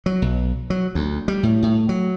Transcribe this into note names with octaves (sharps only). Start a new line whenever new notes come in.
F#3
B1
F#3
D2
G3
A2
A2
F#3